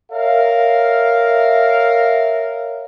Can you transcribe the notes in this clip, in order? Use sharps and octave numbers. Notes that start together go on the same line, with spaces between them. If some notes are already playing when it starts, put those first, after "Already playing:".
A#4 C#5 E5 F5